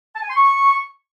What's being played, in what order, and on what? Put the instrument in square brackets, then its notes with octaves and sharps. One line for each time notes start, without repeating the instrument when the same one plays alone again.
[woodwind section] A5
G#5
C6
C#6